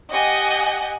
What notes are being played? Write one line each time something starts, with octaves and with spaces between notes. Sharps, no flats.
G4 D#5 F#5 G#5